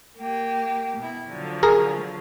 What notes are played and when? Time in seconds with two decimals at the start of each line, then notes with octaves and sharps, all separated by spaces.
0.18 A#3 G4
0.97 B2 E4
1.28 D3 F3 F#3
1.63 G#4 A#4